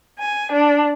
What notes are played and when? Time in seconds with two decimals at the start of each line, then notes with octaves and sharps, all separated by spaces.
0.20 G#5
0.53 D4